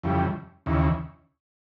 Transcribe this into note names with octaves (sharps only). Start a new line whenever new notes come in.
F2 C#3 E3 G3
D#2 C#3 E3